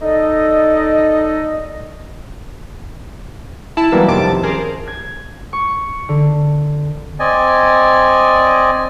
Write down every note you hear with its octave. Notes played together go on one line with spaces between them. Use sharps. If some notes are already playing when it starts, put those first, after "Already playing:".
D#4 A4 D5 D#5
E4 E5 A5
E3 F#3 G3 A#3 B3
G1 F2 C3 D#3 A5 D6
C#4 G#4 A#4 C5
G#6
C#6
D3
C4 D5 D#5 G#5